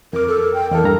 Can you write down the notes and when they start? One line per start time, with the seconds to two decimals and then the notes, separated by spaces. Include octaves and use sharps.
0.13 F2 A#4 D6
0.28 A4
0.42 A#4
0.54 G5
0.71 E2 A4 A#4
0.84 G2 A#5